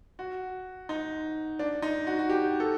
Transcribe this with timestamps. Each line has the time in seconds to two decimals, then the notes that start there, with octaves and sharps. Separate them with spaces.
0.19 F#4
0.89 D#4
1.59 D4
1.82 D#4
2.07 F#4
2.19 F#4
2.29 G4
2.60 A4